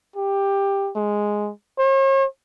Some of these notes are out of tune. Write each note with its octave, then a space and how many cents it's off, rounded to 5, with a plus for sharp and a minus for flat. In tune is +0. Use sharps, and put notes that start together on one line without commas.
G4 +10
G#3 +0
C#5 -45